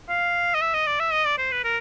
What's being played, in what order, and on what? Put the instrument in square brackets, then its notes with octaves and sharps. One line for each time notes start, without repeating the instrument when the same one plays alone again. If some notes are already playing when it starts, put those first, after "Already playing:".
[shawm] F5
D#5
E5
D#5
D5
E5
D#5
D5
C5
B4
A#4